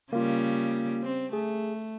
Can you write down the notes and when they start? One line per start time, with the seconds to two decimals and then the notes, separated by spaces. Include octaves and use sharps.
0.13 C#3 G3 A#3 F4
1.03 C4
1.33 A3 G#4